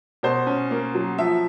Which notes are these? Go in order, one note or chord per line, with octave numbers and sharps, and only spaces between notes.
B2 C5
C#4
A#3
F#3
F3 E5